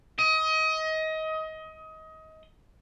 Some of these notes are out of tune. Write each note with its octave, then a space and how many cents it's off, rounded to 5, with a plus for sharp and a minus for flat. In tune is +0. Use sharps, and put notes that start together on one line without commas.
D#5 +25